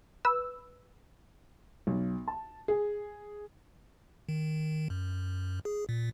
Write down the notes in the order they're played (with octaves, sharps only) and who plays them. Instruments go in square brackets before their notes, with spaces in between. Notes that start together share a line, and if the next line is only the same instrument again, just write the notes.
[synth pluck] B4 E6
[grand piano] B1
A5
G#4
[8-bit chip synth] D#3
F#2
G#4
A#2